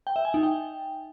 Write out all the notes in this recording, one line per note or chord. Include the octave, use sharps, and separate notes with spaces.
G5
E5
G#5
D#4
G5